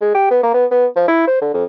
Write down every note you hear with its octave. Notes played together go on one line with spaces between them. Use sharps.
G#3
G4
B3
A#3
B3
B3
F3
E4
C5
D3
F2